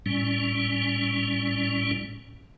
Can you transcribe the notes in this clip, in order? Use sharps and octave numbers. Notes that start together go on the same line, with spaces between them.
A2 G3 C#4